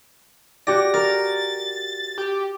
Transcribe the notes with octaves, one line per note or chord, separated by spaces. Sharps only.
F#4 G4 D5 A#6
A#4 A6
G4